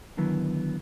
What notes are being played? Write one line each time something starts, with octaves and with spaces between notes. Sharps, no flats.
D3 D#3 F#3 B3 E4